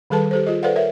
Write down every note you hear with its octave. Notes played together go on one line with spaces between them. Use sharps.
D#3 G3 G#4 A4 B4 A5
G4 A4 C5
F4 G#4 D#5
A4 B4 C5 D5 F5 F#5
A#4 C#5 E5